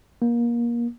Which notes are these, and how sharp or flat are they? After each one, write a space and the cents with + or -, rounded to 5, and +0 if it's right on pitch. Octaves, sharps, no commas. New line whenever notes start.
A#3 +25